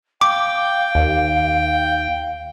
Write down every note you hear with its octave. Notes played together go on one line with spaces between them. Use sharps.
F5 G5 D6
D#2